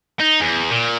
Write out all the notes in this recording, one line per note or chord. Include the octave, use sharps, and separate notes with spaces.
D#4
E2
A#2